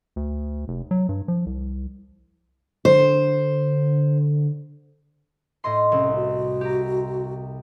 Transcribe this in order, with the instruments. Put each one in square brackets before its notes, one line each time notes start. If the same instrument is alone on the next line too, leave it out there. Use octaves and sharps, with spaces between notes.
[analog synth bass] D2
F1
F#3
G2
F3
C2
[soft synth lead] D3 [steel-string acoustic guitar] C5
[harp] A2 D#5 C6
[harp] C2 [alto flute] C#4
[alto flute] F#4
[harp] G4 A#5